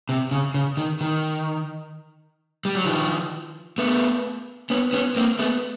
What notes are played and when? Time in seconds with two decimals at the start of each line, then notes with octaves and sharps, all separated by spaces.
0.09 C3
0.31 C#3
0.54 C#3
0.77 D#3
1.01 D#3
2.65 G3
2.75 F#3
2.85 D#3 F3
3.78 A3 B3
4.70 B3 C#4
4.93 B3 C#4
5.16 A#3 C4
5.39 A3 B3